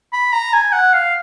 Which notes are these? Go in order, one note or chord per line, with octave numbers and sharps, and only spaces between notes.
B5
A#5
G#5
F#5
F5